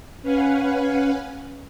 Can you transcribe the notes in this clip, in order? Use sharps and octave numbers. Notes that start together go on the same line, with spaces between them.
C#4 B4 F5 F#5 G#5